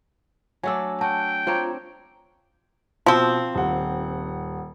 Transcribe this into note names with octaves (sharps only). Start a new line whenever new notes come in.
F#3 A3 D4 G#5 E6
F#4 G5 A5
C4 D4 F4 C#5 A#5
B2 F3 C4
D#1 F#5